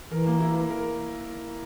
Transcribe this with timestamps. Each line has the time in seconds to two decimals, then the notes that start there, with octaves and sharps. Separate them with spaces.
0.11 E3 A#4
0.26 A#3
0.41 E4
0.55 A#3
0.70 A#4